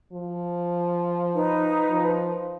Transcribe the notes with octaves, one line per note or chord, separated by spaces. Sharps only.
F3
D#4 B4
F3